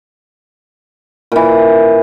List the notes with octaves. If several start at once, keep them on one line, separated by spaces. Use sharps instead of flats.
A#2 E3